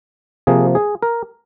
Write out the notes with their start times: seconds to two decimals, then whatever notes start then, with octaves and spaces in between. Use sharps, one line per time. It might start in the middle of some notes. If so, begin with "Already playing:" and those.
0.47 C3 F3 A#3 G#4
0.75 G#4
1.03 A#4